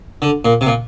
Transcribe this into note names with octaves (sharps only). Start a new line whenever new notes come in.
D3
A#2
C3
A#2